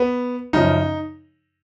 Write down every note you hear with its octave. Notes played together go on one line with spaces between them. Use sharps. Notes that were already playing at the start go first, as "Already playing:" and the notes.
Already playing: B3
F#2 C#3 F3 D#4